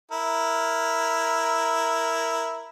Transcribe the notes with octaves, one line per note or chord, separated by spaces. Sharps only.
E4 A#4